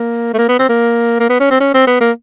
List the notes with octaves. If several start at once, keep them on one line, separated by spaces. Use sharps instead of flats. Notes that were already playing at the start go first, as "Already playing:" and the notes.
Already playing: A#3
A3
A#3
B3
C4
A#3
A#3
B3
C#4
C4
C#4
C4
B3
A#3